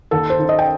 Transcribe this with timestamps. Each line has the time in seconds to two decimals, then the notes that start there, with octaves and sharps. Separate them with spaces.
0.11 D#2 A4
0.30 C5
0.39 D#3
0.49 D#5
0.59 G5